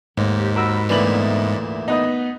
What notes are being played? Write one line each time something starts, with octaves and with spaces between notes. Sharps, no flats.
D#2 G#2 D3 A3
G4
F#4 A#4 B5 E6
D2 A#2 E3 B3 D4 B5 F#7
B3 D#4 B4 D#5